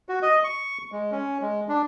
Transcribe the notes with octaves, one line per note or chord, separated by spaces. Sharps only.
F#4
D#5
C#6
G#3
C#4
G#3
D4